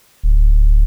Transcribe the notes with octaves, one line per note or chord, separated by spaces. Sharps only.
D1